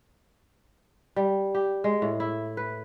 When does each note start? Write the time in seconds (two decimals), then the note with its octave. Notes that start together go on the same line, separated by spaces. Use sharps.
1.16 G3
1.55 G4
1.84 G#3
2.02 A2
2.20 E4
2.57 B4